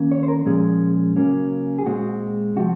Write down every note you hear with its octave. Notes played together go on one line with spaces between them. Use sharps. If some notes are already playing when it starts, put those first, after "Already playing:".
Already playing: D#3 A#3 C#4
C#5
C5
A#4
A#2 F3 G#3 C#4 G#4
C#3 F#3 A#3 C#4
G#4
A#2 G#3 C4 F#4
C3 F3 F#4